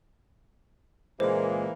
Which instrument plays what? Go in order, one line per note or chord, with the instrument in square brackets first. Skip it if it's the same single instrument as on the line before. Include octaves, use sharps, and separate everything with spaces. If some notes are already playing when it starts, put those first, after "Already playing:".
[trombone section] C#2 A#2 G#3 [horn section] E3 A#3 [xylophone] C5